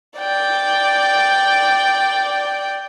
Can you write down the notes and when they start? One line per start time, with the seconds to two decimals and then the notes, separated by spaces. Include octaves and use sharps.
0.18 D5 G5